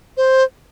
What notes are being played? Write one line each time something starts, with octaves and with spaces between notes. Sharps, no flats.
C5